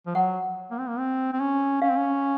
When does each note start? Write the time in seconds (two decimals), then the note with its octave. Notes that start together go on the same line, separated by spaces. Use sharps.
0.06 F3
0.15 F#3 F#5
0.71 A#3
0.79 C4
0.88 A#3
0.99 C4
1.33 C4
1.40 C#4
1.82 C#4 F5
1.90 C4
1.97 C#4